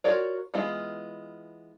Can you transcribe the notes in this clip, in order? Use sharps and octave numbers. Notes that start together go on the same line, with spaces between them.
F4 F#4 A#4 C#5 D5
E3 G#3 B3 F4